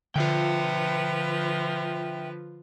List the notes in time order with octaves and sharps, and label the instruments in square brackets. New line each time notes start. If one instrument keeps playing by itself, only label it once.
[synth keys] D3 F4 [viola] F3 B4 [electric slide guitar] E5 G5